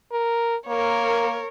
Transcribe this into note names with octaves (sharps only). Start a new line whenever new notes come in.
A#4
A#3 A#4 C#5